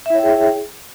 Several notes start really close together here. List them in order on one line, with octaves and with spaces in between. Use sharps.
E5 E4 C#5 G5 G#4